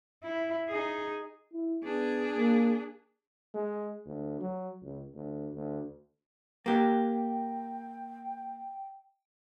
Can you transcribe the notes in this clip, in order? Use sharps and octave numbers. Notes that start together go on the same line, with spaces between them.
E4
D#4 G#4
E4
B3 D4 G#4
A#3
G#3
D2
F#3
C#2
D2
D2
A#3 G4 G5